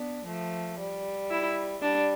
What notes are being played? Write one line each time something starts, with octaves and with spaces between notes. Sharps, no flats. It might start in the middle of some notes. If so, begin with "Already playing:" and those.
Already playing: B3 D4
F3 A3
G3
E4
G3 D4